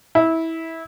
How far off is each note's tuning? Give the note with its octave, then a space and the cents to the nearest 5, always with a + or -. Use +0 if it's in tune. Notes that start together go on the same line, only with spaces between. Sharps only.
E4 -20